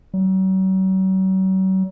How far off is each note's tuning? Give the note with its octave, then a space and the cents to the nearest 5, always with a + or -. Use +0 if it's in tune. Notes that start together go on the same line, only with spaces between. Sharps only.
F#3 +40